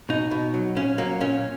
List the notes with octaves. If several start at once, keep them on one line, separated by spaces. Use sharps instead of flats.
B2 D#4
B2
F#3
A#2 C#4
F#3 A#3
A#2 C#4